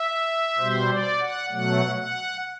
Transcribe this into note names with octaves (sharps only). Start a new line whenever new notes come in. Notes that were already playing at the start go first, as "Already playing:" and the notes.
Already playing: E5
B2 G3 C5
D5
F#5
B2 F#3 A3 F#5
F#5